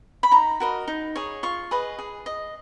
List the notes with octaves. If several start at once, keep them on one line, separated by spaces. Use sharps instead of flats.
B5
D#4 A#5
F#4 A#4 D#5
D#4
G#4 C#5
F4 C#6
G#4 B4 D#5
G#4
D#5